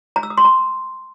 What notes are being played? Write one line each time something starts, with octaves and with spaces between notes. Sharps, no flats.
A#5
E6
D#6
C6
A#5